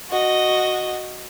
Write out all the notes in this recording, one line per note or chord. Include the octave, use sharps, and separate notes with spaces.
F#4 D#5